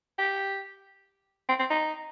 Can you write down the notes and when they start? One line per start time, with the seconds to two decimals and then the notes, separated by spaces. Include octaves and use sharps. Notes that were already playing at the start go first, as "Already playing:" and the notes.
0.18 G4
1.49 C4
1.59 C4
1.70 D#4